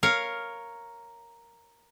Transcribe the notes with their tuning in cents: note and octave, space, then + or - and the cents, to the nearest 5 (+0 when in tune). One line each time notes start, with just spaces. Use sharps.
A#4 +0 C#5 +0 F5 +0